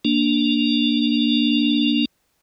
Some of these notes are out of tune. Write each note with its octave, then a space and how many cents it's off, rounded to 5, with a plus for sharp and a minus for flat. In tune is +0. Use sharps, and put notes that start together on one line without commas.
A#3 +0 D4 +0